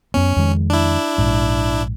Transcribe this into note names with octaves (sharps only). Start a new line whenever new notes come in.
F#2 B3 C#4
F2 D#3 G#3
D4 E4
A#1 G#2